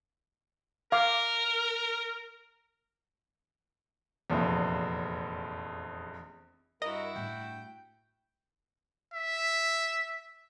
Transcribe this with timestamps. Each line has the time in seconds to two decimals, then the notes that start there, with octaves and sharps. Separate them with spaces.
0.92 A#4 F5 D6
4.30 F1 A#1 E2
6.82 G2 E4 F#4 A#4 D#5
7.16 A2 D4 G5
9.14 E5